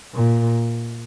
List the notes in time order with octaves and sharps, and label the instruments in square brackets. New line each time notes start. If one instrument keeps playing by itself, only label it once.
[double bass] A#2